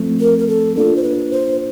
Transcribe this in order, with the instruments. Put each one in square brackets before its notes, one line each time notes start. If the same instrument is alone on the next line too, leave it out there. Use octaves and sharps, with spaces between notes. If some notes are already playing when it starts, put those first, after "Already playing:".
Already playing: [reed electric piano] F3 A3 C4
[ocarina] A#4
A#4
A4
[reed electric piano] A#3 D4 F4 [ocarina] A4
[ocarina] C5
B4
C5